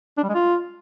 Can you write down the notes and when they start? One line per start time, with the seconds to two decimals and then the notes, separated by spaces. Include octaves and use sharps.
0.18 D4
0.23 G3
0.29 G#3
0.35 F4